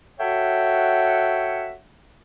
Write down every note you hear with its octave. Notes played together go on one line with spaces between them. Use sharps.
F#4 A4 C#5 E5 F#5 G5